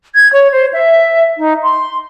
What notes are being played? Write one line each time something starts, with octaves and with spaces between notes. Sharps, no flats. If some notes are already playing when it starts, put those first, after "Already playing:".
G#6
C#5
C5
E5
D#4
C6